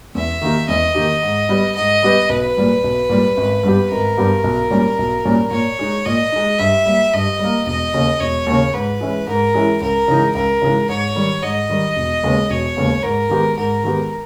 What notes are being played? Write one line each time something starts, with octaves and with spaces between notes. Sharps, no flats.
E2 E5
D#3 A#3 D#4 G4
E2 D#5
D#3 A#3 D#4 G4
G#2
G3 B3 G4 B4
G#2 D#5
G3 B3 G4 B4
B1 B4
A#2 G3
B1
A#2 G3
G#1
G2 G3 B3 G4
G#1 A#4
G2 G3 B3 G4
B1
A#2 G3 C#4
B1
A#2 G3 C#4
A#2 C#5
G#3 D#4
A#2 D#5
G#3 D#4
G2 E5
G3 A#3
G2 D#5
G3 A#3
E1 D#5
D#2 C#3
E1 C#5
D#2
C#3
G#2 B4
E3 G#3 C#4 E4
G#2 A#4
E3 G#3 C#4 E4
C#2 A#4
C#3 E3 G#3 D#4
C#2 A#4
C#3 E3 G#3 D#4
G#2 C#5
D#3 G3
G#2 D#5
D#3 G3
E1
D#2 C#3 G#3 B3
E1 C#5
D#2 C#3 G#3 B3
G#2 A#4
D#3 G#3 B3 G4
G#2 A#4
D#3 G#3 B3 G4